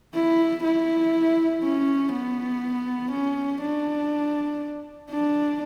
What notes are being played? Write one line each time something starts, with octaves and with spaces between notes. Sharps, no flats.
E4
E4
C#4
B3
C#4
D4
D4